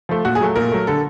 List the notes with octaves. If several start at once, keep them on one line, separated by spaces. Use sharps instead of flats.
F3 A3
A#2 F#4
G#4
F#3 A3
A#2 A#4
F#3 A3
D3 A4